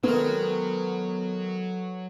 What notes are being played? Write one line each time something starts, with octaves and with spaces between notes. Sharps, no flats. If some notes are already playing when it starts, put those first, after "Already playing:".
D#3 F#3 G#3 B3 A4 B4